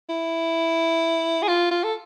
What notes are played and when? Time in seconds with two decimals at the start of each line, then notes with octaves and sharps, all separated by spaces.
0.10 E4
1.43 G#4
1.48 F4
1.71 F4
1.84 A4